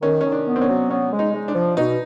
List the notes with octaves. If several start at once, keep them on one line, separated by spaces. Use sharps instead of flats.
D#3 C#4
D#3 C#4
D4
B3
C4
C#4
F#3
B3 C#4
G#3
D#4
G#3
D4
F3
B2 D#4